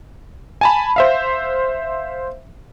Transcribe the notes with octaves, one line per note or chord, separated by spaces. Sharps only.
G#5 A5 B5
C5 E5 F5